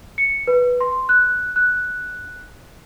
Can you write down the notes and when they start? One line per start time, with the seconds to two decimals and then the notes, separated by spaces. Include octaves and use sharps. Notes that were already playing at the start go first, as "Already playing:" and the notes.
0.18 C#7
0.47 B4
0.81 C6
1.09 F#6
1.56 F#6